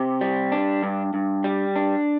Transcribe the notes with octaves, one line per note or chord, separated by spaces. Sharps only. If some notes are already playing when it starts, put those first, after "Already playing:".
Already playing: C3 G4
G3
D4
G2
G2
G3
D4